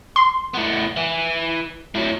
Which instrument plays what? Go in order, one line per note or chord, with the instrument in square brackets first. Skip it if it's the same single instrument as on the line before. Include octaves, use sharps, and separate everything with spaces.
[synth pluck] C6
[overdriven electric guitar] A2 B3
E3
A2 F#3